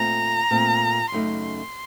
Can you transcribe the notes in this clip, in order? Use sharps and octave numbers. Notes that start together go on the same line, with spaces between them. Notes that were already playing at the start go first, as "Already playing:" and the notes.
Already playing: A#2 A3 C4 A#5
A#2 A3 C4
F#2 C#3 A3 D#4 C6